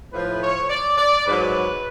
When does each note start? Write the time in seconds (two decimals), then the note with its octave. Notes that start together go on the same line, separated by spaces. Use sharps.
0.13 A2 F3 B4
0.41 C#5
0.69 D5
0.97 D5
1.25 G#2 F#3 B4